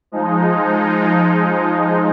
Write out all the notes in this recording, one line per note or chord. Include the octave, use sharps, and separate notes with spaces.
F3 G#3 D#4